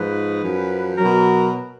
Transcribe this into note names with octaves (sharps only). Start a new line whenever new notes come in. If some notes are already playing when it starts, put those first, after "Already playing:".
Already playing: G#2 F3 B4
F#2 F3
B2 F#3 A#4